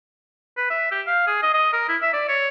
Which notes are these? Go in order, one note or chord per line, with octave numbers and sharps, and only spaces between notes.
B4
E5
G4
F5
G#4
D#5
D#5
A#4
E4
E5
D5
C#5